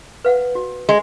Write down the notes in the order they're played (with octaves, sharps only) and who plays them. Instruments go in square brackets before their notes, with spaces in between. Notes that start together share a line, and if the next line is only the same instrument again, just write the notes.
[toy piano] B4 F5 F#5
F#4
[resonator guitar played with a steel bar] G#3